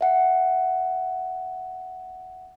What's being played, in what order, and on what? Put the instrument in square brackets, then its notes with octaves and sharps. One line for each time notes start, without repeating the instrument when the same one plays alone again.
[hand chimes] E5 F#5